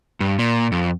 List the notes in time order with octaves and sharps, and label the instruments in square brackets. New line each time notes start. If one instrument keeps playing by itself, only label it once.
[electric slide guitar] G2
A#2
F2